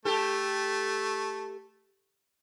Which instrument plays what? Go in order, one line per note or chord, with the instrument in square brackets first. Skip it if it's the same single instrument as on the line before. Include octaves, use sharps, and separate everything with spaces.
[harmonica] A3 [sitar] G4 A4